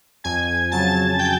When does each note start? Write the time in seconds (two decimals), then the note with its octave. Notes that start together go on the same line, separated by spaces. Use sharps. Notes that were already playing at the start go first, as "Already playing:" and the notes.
0.24 F2 G#5 G#6
0.71 C#3 F#3 A5 A6
1.19 G5 G6